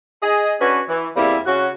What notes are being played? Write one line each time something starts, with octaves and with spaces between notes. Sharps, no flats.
G#4 D#5
C#4 D4 F#4 B4
E3
E2 G3 A#3 C4 E4
C#3 C#4 F#4